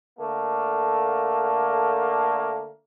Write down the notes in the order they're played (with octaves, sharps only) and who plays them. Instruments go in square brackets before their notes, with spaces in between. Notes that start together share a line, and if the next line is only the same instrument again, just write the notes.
[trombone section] D3 A3 A#3